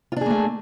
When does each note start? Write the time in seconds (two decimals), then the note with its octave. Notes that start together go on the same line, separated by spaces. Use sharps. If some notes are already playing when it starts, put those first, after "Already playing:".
0.12 F4
0.17 D4
0.21 G#4
0.26 A#3
0.30 A3